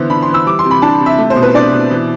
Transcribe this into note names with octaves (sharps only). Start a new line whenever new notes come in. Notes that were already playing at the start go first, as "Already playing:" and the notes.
Already playing: D3 E3 B3 C5
D4 B5
C6
E3
E6
G3 D6
C6
C3
B5
D4 A5
C3
E5
A3
C5
B2
B4
D4 D5
B2
E3